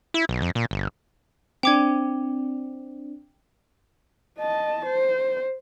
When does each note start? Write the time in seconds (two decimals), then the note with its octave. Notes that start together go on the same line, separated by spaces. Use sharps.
0.14 E4
0.29 B1
0.42 F2
0.55 A#2
0.71 G1
1.63 C4 D4 G5 D6 G#6
4.39 D#5 A5
4.86 C5